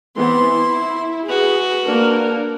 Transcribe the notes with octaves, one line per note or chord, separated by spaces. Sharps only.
E3 B3 C4 C6
E4
F#4 G#4 B4
A#3 D4 A#4